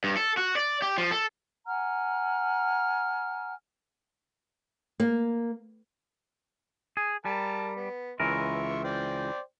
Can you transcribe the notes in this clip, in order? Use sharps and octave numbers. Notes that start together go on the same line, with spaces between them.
G2
A4
F#4
D5
G4
F3
A4
F#5 G#5 A#5 F6
A#3
G#4
G3 A#4 A5 A#5
B3
C#2 E3 A#4 E5 C6 C#6
C5 D5 G5